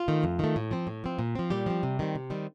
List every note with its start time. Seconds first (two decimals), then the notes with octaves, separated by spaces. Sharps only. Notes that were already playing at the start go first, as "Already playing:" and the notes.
Already playing: F4
0.08 D#3 A3
0.24 F2
0.39 D#3 A3
0.56 A2
0.71 F3 C4
0.87 A2
1.04 F3 C4
1.19 A#2
1.35 F3 C4
1.50 A#2 G3 G4
1.66 F3 C4
1.83 C3
1.99 D#3 G3 C4
2.15 C3
2.30 D#3 G3 C4